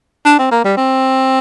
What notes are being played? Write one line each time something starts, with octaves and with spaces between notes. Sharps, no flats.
D4
C4
A#3
G3
C4